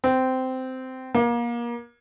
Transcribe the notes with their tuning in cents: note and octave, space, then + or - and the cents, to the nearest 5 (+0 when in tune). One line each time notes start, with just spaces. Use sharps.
C4 -15
A#3 +30